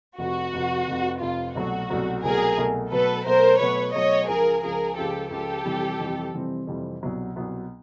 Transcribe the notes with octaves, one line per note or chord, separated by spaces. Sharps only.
F1 F2 C3 F#4
F1 F2 C3
F1 F2 C3
F1 F2 C3 F4
C2 B2 F#3 A3 F#4
C2 B2 F#3 A3
C2 B2 F#3 A3 G#4 A#4
C2 B2 F#3 A3
B2 F#3 A3 A4 B4
B2 F#3 A3 A#4 C5
B2 F#3 A3 B4 C#5
B2 F#3 A3 C#5 D#5
C#2 C#3 F3 G#4 A#4
C#2 C#3 F3 G#4 A#4
C#2 C#3 F3 G4 A4
C#2 C#3 F3 G4 A4
F2 C3 E3 G3 C4
F2 C3 E3 G3 C4
F2 C3 E3 G3 C4
F2 C3 E3 G3 C4
C2 B2 F#3 B3
C2 B2 F#3 B3